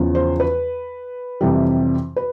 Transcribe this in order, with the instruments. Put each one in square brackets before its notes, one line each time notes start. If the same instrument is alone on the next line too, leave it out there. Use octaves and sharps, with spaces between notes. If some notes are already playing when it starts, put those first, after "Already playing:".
Already playing: [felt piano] E2 C#3 F3
C5
B4
F2 C3 E3 G3
B4